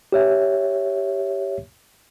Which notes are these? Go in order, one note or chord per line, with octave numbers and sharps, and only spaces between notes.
G4 C#5 E5